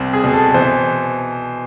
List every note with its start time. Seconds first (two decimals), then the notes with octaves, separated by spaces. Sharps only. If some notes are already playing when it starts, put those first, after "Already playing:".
Already playing: C2 C4
0.13 G#4
0.24 B2
0.33 A4
0.54 E3 C5